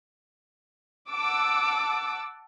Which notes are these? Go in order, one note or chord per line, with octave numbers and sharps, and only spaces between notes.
F#5 A5 D6 E6